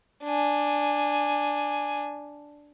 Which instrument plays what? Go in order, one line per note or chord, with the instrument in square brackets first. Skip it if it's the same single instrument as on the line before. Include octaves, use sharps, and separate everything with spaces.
[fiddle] D4 G#5